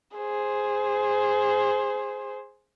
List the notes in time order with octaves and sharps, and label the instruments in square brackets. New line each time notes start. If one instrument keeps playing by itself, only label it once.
[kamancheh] G#4 C5